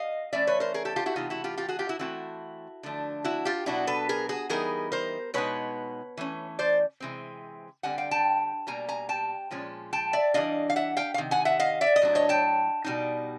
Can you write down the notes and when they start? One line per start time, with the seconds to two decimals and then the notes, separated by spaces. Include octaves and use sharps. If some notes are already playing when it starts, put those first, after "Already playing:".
Already playing: D#5 F5
0.33 E3 A3 C#4 D5 E5
0.47 B4 C#5
0.60 A#4 C5
0.74 G#4 A#4
0.85 G4 A4
0.96 F4 G4
1.06 E4 F#4
1.16 C3 E3 A3 D#4 F4
1.30 E4 F#4
1.44 F4 G4
1.57 F4 G4
1.68 F#4 G#4
1.79 F4 G4
1.89 E4 F#4
1.99 E3 A3 C4 E4 F#4
2.83 D3 F3 A3 D4
3.24 E4 F#4
3.45 F4 G4
3.66 B2 F#3 B3 D4 E4 F#4
3.87 A4 B4
4.09 G#4 A#4
4.29 F#4 G#4
4.49 E3 G3 B3 D#4 G#4 A#4
4.92 A#4 C5
5.34 B2 G#3 B3 D#4 B4 C#5
6.17 E3 A3 C#4
6.59 C5 D5
7.00 C3 E3 G#3 C4
7.83 D3 G3 C4 F#5 G#5
7.98 F5 G5
8.11 G5 A5
8.67 B2 G3 A#3 G#5 A#5
8.89 G#5 A#5
9.09 G5 A5
9.51 A#2 F3 G#3 C#4
9.93 G5 A5
10.13 D5 E5
10.34 E3 G3 B3 D4 D#5 F5
10.70 F5
10.76 E5 F#5
10.97 F5 G5
11.14 F5
11.18 C3 D#3
11.31 F#5 G#5
11.45 E5 F#5
11.59 D#5 F5
11.81 D5 E5
11.96 D#5
12.02 A2 F#3 D4
12.15 C#5 D#5
12.29 G5 A5
12.84 B2 G3 C4 D#4